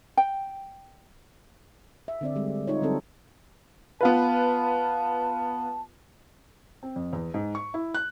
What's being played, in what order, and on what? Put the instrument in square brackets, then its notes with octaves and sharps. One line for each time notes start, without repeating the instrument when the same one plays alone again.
[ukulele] G5
[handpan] E5
D3 C4 D5
G3 G#3 C4
D#4 F4 C#5
D3 F#3 G3 C4 A4
[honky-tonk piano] B3 F4 B4 [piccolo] A5
[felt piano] C4
F2
E2
G#2
C#6
E4
F#6